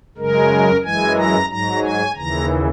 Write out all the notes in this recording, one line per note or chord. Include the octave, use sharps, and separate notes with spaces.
F#2 C#3 G#3 A#4
F#2 E3 G#3 G#5
A#5
G#2 F#3 A#5
G#5
D#2 C#3 E3 A#5